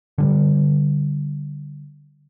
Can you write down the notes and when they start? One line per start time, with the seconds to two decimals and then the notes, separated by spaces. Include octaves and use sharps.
0.18 D3 G3